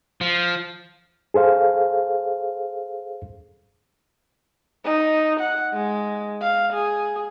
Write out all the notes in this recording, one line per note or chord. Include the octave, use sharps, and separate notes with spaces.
F3
G#4 A4 C5 F5
D#4
F#5
G#3
F5
G#4